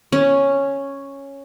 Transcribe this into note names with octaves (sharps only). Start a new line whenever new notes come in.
C#4